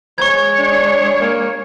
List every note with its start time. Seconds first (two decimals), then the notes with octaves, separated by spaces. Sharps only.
0.18 G#3 C#5 C#6 G#6
0.59 D4
1.21 A#3